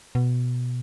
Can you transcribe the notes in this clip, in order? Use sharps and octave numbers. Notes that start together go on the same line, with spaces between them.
B2